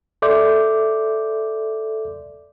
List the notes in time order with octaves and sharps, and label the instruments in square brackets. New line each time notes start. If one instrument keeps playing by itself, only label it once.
[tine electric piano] A4 D5 E5 C6 D6 G6